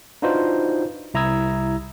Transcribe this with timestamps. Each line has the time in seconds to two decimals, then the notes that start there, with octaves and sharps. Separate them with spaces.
0.22 D4 D#4 F4 F#4 B4 C5
1.14 C2 E4 A#5 D#6 E6 G#6